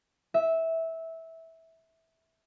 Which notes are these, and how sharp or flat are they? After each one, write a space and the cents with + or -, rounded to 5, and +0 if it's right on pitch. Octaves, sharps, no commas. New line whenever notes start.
E5 -15